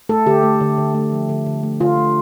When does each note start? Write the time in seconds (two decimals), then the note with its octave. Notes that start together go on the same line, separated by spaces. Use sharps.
0.09 A3 A4
0.26 D3 G4
0.43 A3
0.61 D3
0.78 D3
0.95 A3
1.12 F3
1.29 D3
1.46 D3
1.63 A3
1.80 D3 F4
1.97 A3